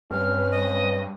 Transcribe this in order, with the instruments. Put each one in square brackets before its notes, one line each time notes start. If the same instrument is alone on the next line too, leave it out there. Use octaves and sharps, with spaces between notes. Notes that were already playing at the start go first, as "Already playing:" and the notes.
[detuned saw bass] G2 [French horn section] C4 C#4 B4 [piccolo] F6
[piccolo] D#5